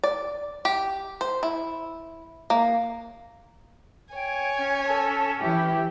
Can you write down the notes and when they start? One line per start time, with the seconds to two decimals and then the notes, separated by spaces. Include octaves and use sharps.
0.04 D5
0.65 G4
1.21 C5
1.43 E4
2.50 A#3
4.14 C#5 G5 G#5
4.58 C#4
4.86 A4
5.41 E3 E4 G4